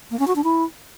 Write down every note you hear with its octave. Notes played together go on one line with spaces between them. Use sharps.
A#3
C#4
F#4
D4
E4